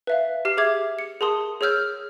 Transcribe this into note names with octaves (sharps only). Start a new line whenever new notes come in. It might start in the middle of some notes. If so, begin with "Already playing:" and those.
B4 E5 F5
G4 F6 C7
G#4 E5 D6 G#6
C#7
G#4 A#4 A5 C6 D#6
G#4 C#5 E6 F6 G6